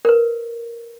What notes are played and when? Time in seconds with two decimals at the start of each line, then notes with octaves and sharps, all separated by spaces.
0.05 A#4 B4